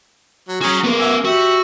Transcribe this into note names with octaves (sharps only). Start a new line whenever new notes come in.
F#3
C#4 F#4 G#4 A#5
G#3 B3 A#4
F#4 E5 G#5
F#4 G4 E5